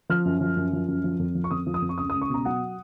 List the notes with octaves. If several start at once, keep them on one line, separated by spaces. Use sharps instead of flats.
F3 F6
F#2
F3
F#2
F3
F#2
F3
F2
F3
C#6
F2 D#6
F3
D#6
F2
C#6
C#2 D#6
C#2 D#6
C#6
B2 A#5
F#3 F#5